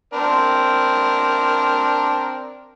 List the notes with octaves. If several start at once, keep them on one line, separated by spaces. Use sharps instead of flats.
C4 D4 A#4